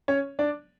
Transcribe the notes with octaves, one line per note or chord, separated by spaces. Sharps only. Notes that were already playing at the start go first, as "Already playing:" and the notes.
C#4 C#5
D4 D5